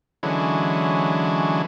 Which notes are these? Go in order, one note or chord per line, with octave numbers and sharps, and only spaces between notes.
D3 E3 F#3 G#3 C#4